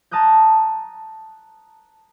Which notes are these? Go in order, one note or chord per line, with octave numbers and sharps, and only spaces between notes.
A5 A#5 D#6 F#6 G6